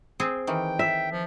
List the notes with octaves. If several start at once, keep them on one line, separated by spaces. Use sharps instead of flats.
C4 G#4 C5
D#3 E3 G5
E5
F3